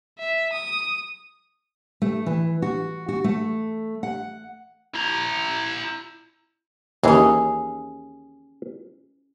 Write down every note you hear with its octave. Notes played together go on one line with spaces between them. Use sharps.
E5
D#6
A3
E3
F#4
F#4
A3
F#5
E4 A#5
D#2 E3 C#4 G#4